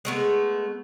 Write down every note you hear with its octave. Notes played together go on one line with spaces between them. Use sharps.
G#3 A3 B3